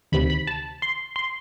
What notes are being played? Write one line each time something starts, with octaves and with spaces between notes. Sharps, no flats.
D2 C3 D#3 B5
B5
A5
C6
C6